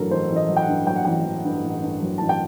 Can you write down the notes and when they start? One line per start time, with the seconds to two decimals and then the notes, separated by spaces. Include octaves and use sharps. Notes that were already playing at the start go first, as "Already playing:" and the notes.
Already playing: A1 G2 F#3 A4 A#4
0.11 A1 C5
0.30 A1
0.36 D#5
0.49 F#3
0.56 G5
0.62 F#5
0.68 G2
0.87 F#3 G5
0.96 F#5
1.05 A1 G5
1.25 A1
1.45 G2
1.64 A1
1.83 G2
2.02 F#3
2.18 A1 A5
2.29 G5